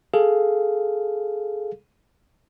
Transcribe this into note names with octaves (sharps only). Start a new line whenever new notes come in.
G#4 A4 F5